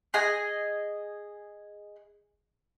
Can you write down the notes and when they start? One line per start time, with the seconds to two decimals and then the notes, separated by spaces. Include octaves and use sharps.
0.14 G#4 D#5 G#5